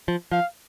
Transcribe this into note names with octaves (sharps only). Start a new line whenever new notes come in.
F3
F3 F5